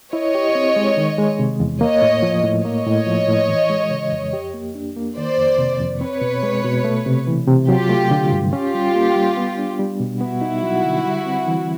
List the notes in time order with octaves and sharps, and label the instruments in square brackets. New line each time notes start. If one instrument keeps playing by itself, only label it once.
[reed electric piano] E4 [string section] C#5 D#5
[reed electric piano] G4
C4
G#3
D#3
G#3
C3
E2
[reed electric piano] A#3 [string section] C#5 D#5
[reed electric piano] A2
F3
A2
[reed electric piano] A#3 [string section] C#5 D#5
[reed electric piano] A2
F3
A2
E3
G#3
C#3
F2
G4
A#3
D4
A#3
[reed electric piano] D#3 [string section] C5 D5
[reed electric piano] F2
C3
F2
[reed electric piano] C4 [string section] B4 C#5
[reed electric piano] B2
G#3
B2
A3
C3
E3
C3
[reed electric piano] F#3 [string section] F4 G4
[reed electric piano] A3
D3
G2
[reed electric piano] C#4 [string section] F4 G4
[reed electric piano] G3
A#3
G3
B3
D4
G3
B2
[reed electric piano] B3 [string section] E4 F#4
[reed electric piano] D#4
F#3
D3
G3
C4
E3